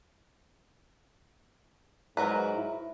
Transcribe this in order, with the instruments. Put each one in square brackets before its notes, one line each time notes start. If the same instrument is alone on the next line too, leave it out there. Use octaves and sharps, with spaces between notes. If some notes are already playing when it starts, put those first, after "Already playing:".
[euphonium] G#2 [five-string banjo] F#3 A#4 B4
[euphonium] E4